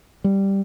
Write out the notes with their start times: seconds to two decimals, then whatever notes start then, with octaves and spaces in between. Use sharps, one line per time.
0.24 G3